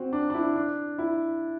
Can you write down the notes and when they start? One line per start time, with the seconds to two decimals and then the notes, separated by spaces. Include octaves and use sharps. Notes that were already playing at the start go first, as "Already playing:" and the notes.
Already playing: C4 F#4
0.13 D4
0.30 D4
0.34 E4
0.56 D4
0.99 E4